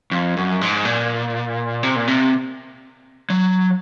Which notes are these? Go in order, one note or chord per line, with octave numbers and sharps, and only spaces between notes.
F2
F#2
G#2
A#2
C3
A#2
C3
F#3